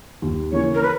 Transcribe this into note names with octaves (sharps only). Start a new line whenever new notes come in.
D#2
C#3 E3 A#3 C#4 C#5
A#4
B4